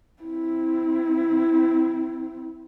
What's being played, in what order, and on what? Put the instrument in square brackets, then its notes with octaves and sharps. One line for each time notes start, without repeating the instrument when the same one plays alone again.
[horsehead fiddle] C4 E4